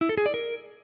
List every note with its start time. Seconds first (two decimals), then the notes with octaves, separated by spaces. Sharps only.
0.01 E4
0.09 A4
0.18 G#4
0.26 D5
0.34 A#4